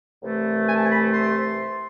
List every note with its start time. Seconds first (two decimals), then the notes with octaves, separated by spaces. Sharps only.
0.22 C2 C3 E3 A3
0.67 G#5
0.74 A5
0.82 G#5
0.90 B5
1.13 C6